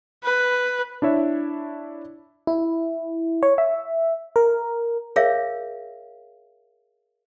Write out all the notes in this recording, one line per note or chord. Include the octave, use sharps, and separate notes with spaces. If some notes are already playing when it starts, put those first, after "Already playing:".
B4
D4 E4 C#5 E5
E4
C#5
E5
A#4
G#4 A#4 C#5 E5 F5